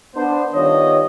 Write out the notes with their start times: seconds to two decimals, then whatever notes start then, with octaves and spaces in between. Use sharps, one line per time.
0.16 B3 D4 C5
0.55 D#3 G3 B3 F4 C#5 D#5